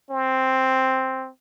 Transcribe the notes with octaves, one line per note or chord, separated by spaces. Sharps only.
C4